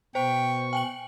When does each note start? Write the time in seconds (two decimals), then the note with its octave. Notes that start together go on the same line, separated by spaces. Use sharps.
0.15 B2 C5 G5 C#6
0.73 G5 G#5 F#7